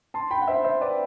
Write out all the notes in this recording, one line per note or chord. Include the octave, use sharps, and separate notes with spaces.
A5 C6
G5 B5
F#5
C5 E5
C5 E5
B4 D5